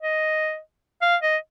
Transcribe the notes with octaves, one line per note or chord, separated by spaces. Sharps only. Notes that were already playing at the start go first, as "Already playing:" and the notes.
D#5
F5
D#5